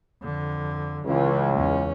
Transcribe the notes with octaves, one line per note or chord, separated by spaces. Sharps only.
F2 D3
C#2 C#3 E3
E2 C#4